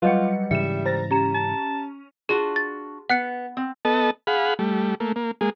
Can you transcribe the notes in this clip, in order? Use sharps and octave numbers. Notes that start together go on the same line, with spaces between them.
F#3 G3 F4 B4 D#5 F#5 C#7
G#2 C#3 E3 G3 E5 C#7 E7
C5 A#5 A6 A#6
C#4 G4 A#5 E7
A5
D4 F4 F#4 G#4
A6
B3 F#5 F#6 C#7
C4
B3 A4 D#5 A5
G#4 F5 F#5 B5
G3 A3
A3 A#3
A#3
G#3 A#3 G#4